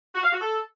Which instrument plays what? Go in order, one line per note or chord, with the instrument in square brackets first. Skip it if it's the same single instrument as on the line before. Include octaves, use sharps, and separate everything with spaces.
[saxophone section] F#4
F5
F#4
A4